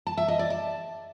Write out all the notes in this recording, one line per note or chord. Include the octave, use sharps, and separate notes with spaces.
A5
E5
D#5
D5
A5